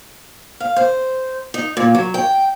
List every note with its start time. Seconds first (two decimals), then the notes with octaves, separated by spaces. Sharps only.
0.60 F5
0.76 C5
1.54 D#4
1.77 A#2
1.95 F#3
2.14 G5